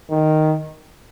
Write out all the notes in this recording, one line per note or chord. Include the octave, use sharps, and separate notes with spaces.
D#3